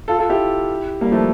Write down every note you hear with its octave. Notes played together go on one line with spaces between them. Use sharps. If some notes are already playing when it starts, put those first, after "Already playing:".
F4 A4
F4 A4
E4 G4
G3 A#3
F3 A3